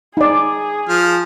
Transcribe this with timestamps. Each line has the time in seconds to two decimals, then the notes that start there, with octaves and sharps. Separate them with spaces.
0.17 D#4 G#4 D5
0.89 F3 F6